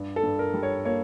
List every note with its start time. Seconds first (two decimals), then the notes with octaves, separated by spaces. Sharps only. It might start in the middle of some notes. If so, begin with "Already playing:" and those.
Already playing: G2
0.16 A4
0.23 G2
0.39 A#4
0.54 G3
0.63 C#5
0.85 A#3 C#5